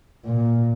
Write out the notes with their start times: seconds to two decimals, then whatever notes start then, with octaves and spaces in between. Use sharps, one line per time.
0.25 A#2